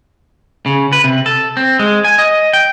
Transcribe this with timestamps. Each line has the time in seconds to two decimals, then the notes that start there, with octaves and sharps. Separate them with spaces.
0.66 C#3
0.93 B4
1.04 C3
1.26 A4
1.57 C4
1.79 G#3
2.05 G#5
2.18 D#5
2.53 G5